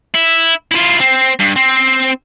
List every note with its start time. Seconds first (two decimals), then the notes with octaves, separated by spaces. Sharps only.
0.14 E4
0.72 E4 F4
1.01 C4
1.40 G2
1.56 C4